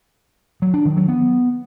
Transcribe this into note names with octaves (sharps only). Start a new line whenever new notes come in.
F#3
D4
D#3
F#3
B3